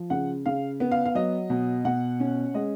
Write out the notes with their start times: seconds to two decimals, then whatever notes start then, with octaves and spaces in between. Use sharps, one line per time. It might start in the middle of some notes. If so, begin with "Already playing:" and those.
Already playing: F3
0.10 C#3 F#5
0.46 C#3 F5
0.80 B3
0.91 F5
1.05 F5
1.15 F#3 D#5
1.50 B2
1.85 B2 F#5
2.20 C#4
2.54 G#3 D#5